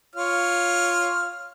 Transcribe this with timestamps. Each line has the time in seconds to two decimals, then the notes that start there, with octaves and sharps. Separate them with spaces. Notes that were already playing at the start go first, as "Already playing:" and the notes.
0.15 F4 C#5 F6